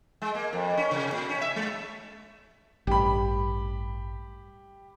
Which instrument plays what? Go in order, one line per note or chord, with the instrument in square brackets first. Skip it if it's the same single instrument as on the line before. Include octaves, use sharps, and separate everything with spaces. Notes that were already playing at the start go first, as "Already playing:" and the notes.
[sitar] G#3
A#3
F2
C#4
C3
A#2
C#4
E5
G#3
[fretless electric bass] A1 G2 [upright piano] G4 B5